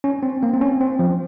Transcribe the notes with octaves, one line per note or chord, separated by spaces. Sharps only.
C#4
C4
A#3
C4
C#4
C4
F3